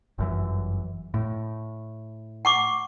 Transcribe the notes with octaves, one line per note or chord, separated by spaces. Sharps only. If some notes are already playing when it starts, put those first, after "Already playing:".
G1 F#2 E3
A2
F#5 C#6 D6